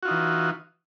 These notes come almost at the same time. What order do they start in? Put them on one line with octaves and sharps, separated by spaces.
F#4 F4 D#4 E3